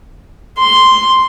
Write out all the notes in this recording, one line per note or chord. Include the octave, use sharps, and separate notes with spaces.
C6